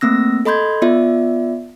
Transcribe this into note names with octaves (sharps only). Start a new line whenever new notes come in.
A3 A#3 C4 E6 A#6
A4 D#5 B5 C6 G6 G#6
B3 F4 D5 E5